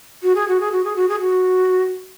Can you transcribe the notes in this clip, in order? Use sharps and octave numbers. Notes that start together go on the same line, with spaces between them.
F#4
G#4
F#4
G#4
F#4
G#4
F#4
G#4
F#4